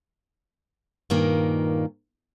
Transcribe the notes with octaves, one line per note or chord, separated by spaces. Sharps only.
G2 A#2 D#3 A#3